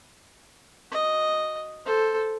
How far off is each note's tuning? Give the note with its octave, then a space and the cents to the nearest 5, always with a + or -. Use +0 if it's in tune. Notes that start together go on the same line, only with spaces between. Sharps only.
F#4 +0 D#5 +0
A4 +0 C5 +0